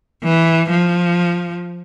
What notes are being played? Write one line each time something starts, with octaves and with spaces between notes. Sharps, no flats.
E3
F3